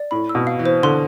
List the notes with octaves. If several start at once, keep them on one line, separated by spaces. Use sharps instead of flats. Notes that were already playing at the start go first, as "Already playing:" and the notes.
Already playing: D5
A2 B5
E6
B2
F5
E3
C5
D3 C6